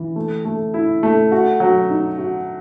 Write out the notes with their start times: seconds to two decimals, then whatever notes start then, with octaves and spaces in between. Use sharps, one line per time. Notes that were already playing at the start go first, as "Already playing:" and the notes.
Already playing: E3
0.16 A3
0.45 A3
0.74 E4
1.03 A3
1.32 F#4
1.60 F#3
1.90 D#4
2.18 F#4